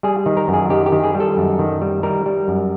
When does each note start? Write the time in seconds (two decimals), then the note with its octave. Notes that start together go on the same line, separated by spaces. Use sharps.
0.03 G3 G#4
0.26 D#3
0.37 A#4
0.48 F#2
0.54 G#4
0.70 D#3 G4
0.86 G4
0.92 D#3
1.04 G#4
1.14 G3
1.20 A4
1.37 F#2
1.59 D#3
1.82 G3
2.03 G3 A#4
2.26 G3
2.48 F#2